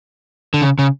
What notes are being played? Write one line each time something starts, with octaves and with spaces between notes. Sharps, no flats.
D3
C#3
C#3